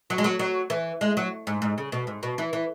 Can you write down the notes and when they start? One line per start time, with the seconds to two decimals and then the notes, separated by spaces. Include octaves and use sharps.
0.10 F#3
0.18 G#3
0.24 F#3
0.39 F#3
0.70 E3
1.01 G#3
1.17 F#3
1.47 G#2
1.62 G#2
1.78 C#3
1.92 B2
2.07 G#2
2.23 B2
2.38 E3
2.53 E3